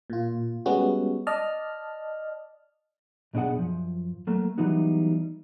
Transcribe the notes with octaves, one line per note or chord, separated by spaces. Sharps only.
A#2 F4
G3 G#3 B3 C#4 F#4
D5 D#5 A5 F6
B1 B2 D4 G#4 F#5
F#2 F3
F#3 A3 A#3
E3 F#3 G3 B3 D#4 F#4